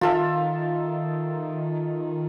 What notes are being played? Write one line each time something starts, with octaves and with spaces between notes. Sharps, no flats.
D#3 F4 A4 E5